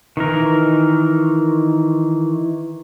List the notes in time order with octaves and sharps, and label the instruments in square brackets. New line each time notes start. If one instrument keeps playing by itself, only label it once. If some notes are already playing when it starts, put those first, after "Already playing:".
[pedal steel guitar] D#3 E3 A#4